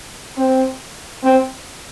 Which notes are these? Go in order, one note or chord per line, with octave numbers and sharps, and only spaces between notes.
C4
C4